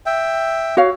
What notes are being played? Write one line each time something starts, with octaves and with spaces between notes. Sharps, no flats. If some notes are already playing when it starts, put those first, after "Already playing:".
E5 G5
F#4 C#5 F5